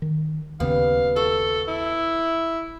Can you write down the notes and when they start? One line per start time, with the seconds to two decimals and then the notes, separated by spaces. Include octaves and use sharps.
0.02 D#3
0.60 D#2 C#3 G3 B3 F5
1.16 F#4 A4
1.68 E4